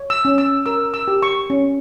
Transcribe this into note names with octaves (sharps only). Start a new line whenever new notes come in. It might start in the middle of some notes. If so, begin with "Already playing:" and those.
Already playing: C#5
E6
C#4
E6
A#4 E6
E6
G4
C#6
C#4